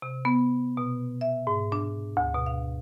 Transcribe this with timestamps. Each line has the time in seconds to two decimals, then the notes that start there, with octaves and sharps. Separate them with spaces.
0.02 C3
0.25 B3
0.77 B2
1.21 E5
1.47 G#2
1.72 D4
2.17 D2
2.35 B2
2.46 F5